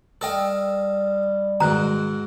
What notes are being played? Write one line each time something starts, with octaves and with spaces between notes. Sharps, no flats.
G3 A4 D#5 F5 G5 E6
G#2 B2 D#3 A#5 F#6